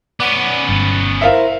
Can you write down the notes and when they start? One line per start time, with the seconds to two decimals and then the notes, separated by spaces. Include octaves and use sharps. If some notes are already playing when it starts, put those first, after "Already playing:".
0.20 B3 C#4 D5 F#5 D6
0.69 G1 A6
1.21 E4 A#4 C5 E5 F5